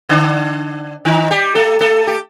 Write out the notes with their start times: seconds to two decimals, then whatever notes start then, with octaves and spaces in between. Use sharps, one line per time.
0.09 D3 D4
1.05 D#3 D#4
1.31 G3 G4
1.55 A3 A4
1.80 A3 A4
2.07 G4